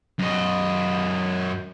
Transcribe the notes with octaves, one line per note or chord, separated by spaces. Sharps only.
F#2 D#5